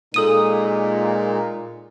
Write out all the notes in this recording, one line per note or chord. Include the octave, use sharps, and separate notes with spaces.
A#2 G#3 D#4 A4 D#6 D#7